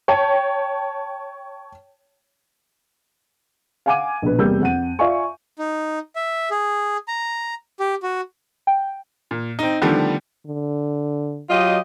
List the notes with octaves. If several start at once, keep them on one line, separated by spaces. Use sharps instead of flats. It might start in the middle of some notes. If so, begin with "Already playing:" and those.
C#5 G5 A5
F5 F#5 G#5 D6 G#6 D#7
A#1 B2 B4
E2 C3 G3 A#3 E6 G6
F2 F#5 D#7
F4 D5 E5 F5 G#5 C#6
D#4
E5
G#4
A#5
G4
F#4
G5
A#2
C4 D#4
D3 D#3 F3 G3 A3 B3
D3
F#3 F4 G4 D#5